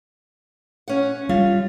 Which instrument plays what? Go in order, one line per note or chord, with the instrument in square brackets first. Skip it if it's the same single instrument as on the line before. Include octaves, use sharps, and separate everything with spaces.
[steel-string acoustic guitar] C#4 F#5
[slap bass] G3 [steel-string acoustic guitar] F4